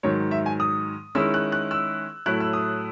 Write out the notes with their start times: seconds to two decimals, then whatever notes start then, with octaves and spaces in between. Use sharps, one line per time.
0.03 G#2 D#3 F#3 C#5
0.31 E5
0.46 G#5
0.60 D#6
1.15 D#3 G#3 C#4 E4 E6
1.34 F#6
1.52 F#6
1.71 E6
2.26 A2 F#3 A3 E4 F#6
2.40 E6
2.53 D#6